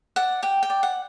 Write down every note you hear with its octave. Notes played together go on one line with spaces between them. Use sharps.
D5 F#5
G4 G5
G5
D5
F#5